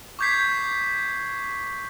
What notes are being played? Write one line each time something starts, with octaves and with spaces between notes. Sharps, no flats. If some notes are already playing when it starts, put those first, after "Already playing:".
C#6 D6 G6 G#6 B6 C7